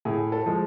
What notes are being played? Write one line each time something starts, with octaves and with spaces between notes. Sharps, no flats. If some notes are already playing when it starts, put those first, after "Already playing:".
A2 G#4
A4
F3 G#3